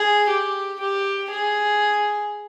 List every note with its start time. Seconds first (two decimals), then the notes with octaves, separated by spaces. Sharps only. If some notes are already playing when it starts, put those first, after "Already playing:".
Already playing: G#4
0.30 G4
0.80 G4
1.30 G#4